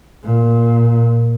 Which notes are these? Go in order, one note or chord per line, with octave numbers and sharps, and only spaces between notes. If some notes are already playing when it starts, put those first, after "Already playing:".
A#2